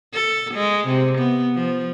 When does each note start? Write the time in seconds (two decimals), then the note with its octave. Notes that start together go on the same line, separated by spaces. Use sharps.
0.13 A4
0.54 G#3
0.88 C3
1.18 B3
1.55 F3